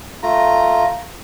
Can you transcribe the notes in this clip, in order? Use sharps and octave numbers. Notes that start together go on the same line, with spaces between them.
A3 F4 A#5